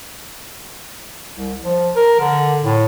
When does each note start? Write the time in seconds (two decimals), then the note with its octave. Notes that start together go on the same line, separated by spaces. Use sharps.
1.35 C2
1.63 F3
1.96 A#4
2.20 D3
2.62 A2